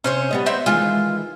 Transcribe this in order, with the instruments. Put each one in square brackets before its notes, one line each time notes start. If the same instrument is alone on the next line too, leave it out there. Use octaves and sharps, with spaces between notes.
[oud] C3 [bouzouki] C#4 C5 C#5
[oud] G3 B3 D#5
[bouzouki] C4 E5 G5
[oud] D#3 E3 G#3 [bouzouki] F4